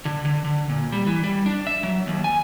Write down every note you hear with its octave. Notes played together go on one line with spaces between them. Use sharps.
D3
D3
D3
A#2
G3
E3
G3
D4
E5
F#3
D#2
G#5